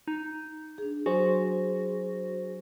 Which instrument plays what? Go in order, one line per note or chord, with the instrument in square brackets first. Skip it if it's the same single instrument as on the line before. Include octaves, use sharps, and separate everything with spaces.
[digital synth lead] D#4
[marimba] D4 G#4
[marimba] F#3 [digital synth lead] F#4 [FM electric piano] G#4 C5